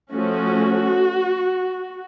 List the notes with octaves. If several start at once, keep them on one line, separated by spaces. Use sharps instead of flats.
F3 A3 C#4 F#4